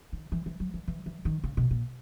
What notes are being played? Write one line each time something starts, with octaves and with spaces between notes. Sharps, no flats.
D#3
E3
E3
F#3
E3
E3
E3
D#3
C#3
B2
A#2